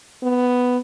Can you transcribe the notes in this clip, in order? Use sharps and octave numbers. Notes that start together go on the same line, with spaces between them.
B3